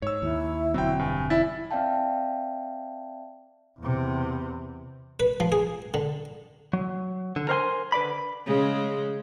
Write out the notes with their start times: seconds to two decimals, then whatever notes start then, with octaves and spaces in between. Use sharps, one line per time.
0.02 G#2 C#5 E6
0.22 D#2 E4
0.74 E1 D3 F#3 C4 G5
0.99 G2 G#5
1.30 E4 A6
1.71 C4 D5 E5 F5 G5 A5
3.79 E2 C3
5.20 B4
5.40 F3
5.52 G#4
5.94 D3
6.73 F#3
7.36 D3
7.49 A#4 C5 C#5 G5 G#5 C6
7.92 D3 B4 D5 B5
8.46 C#3 G#3